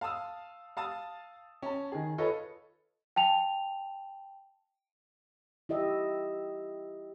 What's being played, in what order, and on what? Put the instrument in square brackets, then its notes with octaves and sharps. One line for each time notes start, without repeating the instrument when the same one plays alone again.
[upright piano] F5 A5 C6 D#6 E6
F5 A5 D#6 E6 A6
C#4 A5
D#3 G#4
F4 A4 B4 C#5 D#5
[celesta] G5 A5 F7
[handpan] E4 G4 D#5 E5